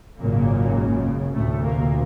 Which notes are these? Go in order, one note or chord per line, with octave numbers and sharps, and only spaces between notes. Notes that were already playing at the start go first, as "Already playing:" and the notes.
G#1 F#2 A#2 C#3 A#3
D2 A2 C3 A3
A#2 A#3